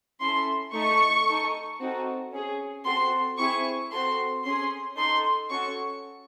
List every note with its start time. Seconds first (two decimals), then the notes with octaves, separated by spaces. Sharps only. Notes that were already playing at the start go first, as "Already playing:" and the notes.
0.20 C#4 E4 A4 C6
0.73 A3 D#4 A4 C#6
1.26 D#4 A4
1.80 C4 D#4 F#4 A4
2.32 C#4 G#4
2.85 C4 F#4 A4 C6
3.38 C4 E4 G#4 C#6
3.91 C4 F#4 A4 C6
4.44 C#4 G#4 C6
4.97 D#4 A4 C6
5.50 C#4 F#4 A4 C#6